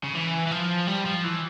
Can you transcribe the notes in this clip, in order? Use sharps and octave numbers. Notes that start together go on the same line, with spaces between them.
C#3
E3
E3
F3
G3
F3
E3